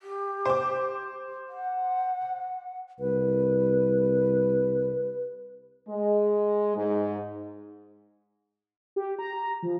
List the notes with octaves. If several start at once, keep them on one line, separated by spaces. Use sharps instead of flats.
G4
C5 D6
F#5
C2 B4
G#3
G#2
G4
A#5
F3